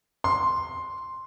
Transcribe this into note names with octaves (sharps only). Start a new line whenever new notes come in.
C6